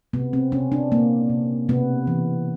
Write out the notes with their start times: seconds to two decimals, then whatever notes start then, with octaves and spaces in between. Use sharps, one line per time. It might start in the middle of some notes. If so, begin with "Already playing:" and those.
0.13 C3 B3
0.33 C4
0.52 C3 C#4
0.72 D4
0.91 C3 A#3
1.30 C3
1.69 C3 B3
2.07 E3